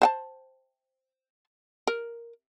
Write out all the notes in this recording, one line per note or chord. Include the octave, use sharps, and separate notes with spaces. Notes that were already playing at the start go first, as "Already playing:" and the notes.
C5 F#5 A5
A#4